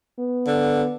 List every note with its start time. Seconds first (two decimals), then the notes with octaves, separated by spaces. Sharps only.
0.19 B3
0.47 D3